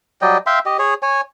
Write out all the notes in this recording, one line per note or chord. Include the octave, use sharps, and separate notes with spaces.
F#3 G3 D#5 G5
E5 F5 G5 C6
G4 D#5
G#4 C#5
C#5 G#5